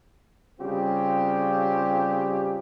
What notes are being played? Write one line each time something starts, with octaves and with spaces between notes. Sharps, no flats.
C#3 G3 C4 F4 G4